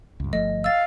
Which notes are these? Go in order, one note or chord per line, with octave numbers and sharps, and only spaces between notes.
C#2 G2
G1 F3 A3 D#5
F5 E6 A6